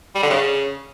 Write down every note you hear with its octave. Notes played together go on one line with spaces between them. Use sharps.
G3
D3
C#3